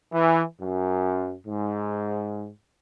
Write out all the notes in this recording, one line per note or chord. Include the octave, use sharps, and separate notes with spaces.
E3
F#2
G#2